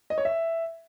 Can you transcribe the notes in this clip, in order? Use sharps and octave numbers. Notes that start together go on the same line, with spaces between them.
D#5
C#5
E5